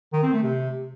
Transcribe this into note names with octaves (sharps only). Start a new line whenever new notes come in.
D#3
C4
A3
C3